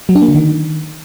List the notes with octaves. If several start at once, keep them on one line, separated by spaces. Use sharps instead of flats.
F#3
D4
A#3
D3
D#3